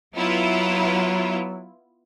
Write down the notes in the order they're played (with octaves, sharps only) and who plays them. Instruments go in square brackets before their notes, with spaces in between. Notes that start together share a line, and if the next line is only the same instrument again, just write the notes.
[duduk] F#3 [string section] B3 E4 F4